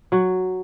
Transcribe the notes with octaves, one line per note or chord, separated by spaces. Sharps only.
F#3 F#4